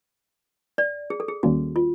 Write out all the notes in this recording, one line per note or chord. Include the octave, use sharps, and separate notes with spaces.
D5
G#4
A4
G#4
D#2 D#3 G3 A#3 C#4 F#4
F4